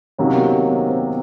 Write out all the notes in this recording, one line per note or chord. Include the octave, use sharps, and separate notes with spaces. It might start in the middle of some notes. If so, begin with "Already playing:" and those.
C3 D#3 F#3 A#3 C#4
B3
C4
B3
C4